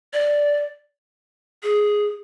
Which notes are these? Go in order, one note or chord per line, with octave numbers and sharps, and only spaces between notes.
D5
G#4